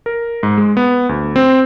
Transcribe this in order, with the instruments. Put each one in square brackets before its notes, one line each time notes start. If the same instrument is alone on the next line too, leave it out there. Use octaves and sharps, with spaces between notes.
[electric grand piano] A#4
G#2
G#3
B3
D2
C4